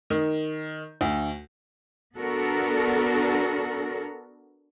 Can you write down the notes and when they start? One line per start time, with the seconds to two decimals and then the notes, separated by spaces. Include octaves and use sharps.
0.10 D#3
1.01 D2
2.18 B3 D4 F#4 A4 A#4